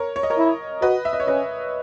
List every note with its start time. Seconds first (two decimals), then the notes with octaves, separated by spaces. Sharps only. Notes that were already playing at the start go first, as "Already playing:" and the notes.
Already playing: A#4 C#5
0.16 C#5
0.23 D#5
0.30 A#4 C#5
0.37 E4
0.82 F#4 B4 D#5
1.05 E5
1.13 D#5
1.20 C#5
1.27 C#4 B4 D#5